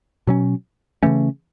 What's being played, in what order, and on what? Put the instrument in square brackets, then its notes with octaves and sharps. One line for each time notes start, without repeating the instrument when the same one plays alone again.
[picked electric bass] B2 F#3 C#4
C#3 E3 A3 C#4